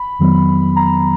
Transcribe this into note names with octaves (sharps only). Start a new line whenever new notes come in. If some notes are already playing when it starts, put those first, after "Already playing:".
Already playing: B5
F2 D#3 F#3 B3
A#5